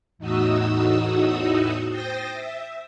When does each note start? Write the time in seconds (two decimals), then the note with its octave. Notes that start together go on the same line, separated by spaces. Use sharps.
0.18 E2 A2 D#4 F#4 D#6 E6
1.89 C5 G5 D#6 A6 A#6
2.32 E5